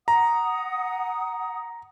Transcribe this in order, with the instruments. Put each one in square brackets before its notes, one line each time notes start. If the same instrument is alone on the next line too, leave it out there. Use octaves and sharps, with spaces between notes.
[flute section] F#5 D#6 [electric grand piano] A#5